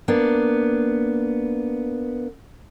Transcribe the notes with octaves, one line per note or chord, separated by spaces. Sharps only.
A#3 B3 D4